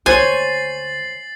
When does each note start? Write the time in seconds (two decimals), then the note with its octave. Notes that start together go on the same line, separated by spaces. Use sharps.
0.06 D2 C5 C#5 G#5 A6 C7 F#7